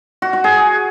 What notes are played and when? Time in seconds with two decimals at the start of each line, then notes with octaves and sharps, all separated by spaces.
0.22 F#4
0.33 F#4
0.44 G#4